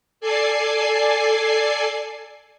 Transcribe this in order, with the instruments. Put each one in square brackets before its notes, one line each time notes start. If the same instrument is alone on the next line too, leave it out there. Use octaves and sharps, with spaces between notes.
[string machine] A4 D5 G#5 C7